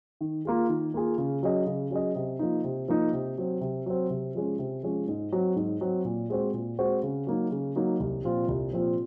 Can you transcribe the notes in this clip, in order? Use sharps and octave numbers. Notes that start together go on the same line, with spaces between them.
D#3
A#3 F4 G#4
D#3
A#3 F4 G#4
C#3
F#3 C#4 G#4 D#5
C#3
F#3 C#4 G#4 D#5
C3
F3 A#3 D#4
C3
F3 A#3 D#4
C3
F#3 C4
C3
F#3 C4
C3
F3 G#3 C#4
C3
F3 G#3 C#4
G#2
F#3 C4
G#2
F#3 C4
A#2
G#3 C4 F#4 C5
A#2
G#3 C4 F#4 C5
C#3
F#3 A#3 D#4
C#3
F#3 A#3 D#4
C2
A#2 F3 C4 F4
C2
A#2 F3 C4 F4